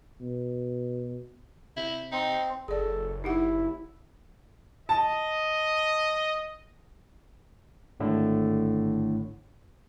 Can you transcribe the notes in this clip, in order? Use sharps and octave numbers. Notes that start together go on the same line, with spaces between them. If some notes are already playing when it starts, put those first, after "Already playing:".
B2
C3 E4
C4 D#4
F#1 G#4 A4 D5
D#4 E4 G4 F#5
D#5 A5
G#1 A2 D3